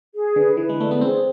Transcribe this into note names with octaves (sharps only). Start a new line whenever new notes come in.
G#4
D3 B4
E3 B4
G#3
A3 D5
B3
C4 G#4